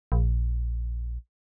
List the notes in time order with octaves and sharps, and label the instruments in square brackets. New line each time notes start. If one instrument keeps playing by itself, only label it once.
[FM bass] A#1